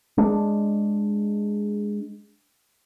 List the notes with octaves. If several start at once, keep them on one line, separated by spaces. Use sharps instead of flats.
G#3 D4